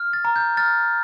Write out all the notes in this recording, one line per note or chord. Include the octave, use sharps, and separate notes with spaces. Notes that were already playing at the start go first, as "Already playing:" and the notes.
Already playing: F6
A6
A#5
G6
F6 A6